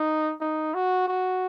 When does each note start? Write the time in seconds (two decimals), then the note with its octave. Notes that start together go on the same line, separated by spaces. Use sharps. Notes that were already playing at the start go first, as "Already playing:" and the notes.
Already playing: D#4
0.41 D#4
0.74 F#4
1.07 F#4